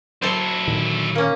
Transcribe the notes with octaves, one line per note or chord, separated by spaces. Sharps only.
F#3 E4 A4 C5
A#2 D3 D#3
A#3 C#4